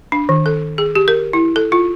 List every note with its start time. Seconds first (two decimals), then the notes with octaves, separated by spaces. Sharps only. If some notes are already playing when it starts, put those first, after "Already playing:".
0.12 D4
0.29 D#3
0.46 A4
0.78 G#4
0.95 G4
1.08 A#4
1.33 E4
1.56 A4
1.72 F4